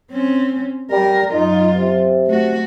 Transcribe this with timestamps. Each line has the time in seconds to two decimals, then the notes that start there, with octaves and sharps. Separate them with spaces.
0.11 C4 C#4
0.91 G3 A#4
1.33 F#2 D#4 F4
1.74 C3
2.27 A3 F#4